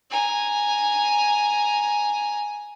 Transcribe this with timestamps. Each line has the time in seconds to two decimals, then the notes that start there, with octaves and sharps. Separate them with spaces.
0.10 G#5 A#5